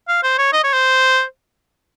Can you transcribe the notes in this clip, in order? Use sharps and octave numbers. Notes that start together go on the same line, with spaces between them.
F5
C5
C#5
D#5
C#5
C5